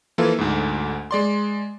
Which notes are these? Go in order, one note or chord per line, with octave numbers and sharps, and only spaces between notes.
E3 F3 A#3 E4 F4 A4
D2 G#2
G#3 D5 C6